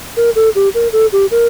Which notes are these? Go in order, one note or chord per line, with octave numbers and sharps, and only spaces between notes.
A#4
A4
G4
A#4
A4
G4
A#4